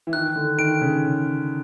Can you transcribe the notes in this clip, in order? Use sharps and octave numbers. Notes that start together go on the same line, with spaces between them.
E3
D#3 F#6
D3
D#3 D7
C#3